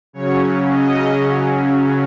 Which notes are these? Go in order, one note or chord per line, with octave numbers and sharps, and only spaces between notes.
C#3 F#3 C#4 C#5
D#5